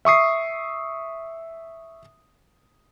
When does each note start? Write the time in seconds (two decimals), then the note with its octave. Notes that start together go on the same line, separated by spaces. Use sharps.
0.05 E5 C#6 D#6 C7